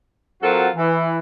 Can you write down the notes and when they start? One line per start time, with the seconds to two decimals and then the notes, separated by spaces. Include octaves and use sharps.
0.42 F#3 C4 F4 F#4 A4 A#4
0.76 E3